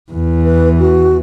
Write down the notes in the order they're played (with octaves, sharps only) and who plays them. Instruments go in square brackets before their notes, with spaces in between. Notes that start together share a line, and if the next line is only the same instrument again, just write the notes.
[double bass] E2 E3
[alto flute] B4
F#4